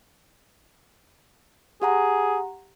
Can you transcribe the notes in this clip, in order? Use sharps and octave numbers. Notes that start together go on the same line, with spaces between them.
G4 G#4 F#5 A#5